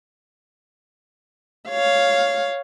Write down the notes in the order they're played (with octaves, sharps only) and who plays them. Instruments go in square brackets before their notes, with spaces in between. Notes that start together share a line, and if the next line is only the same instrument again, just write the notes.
[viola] C#5 F5